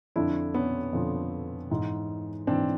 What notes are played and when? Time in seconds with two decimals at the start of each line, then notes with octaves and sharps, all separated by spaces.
0.16 F2 D3 F3 D4 E4
0.54 B3 C#4
0.93 F2 D3 F3
1.70 G#2 E3
2.47 G#2 E3 C4 D4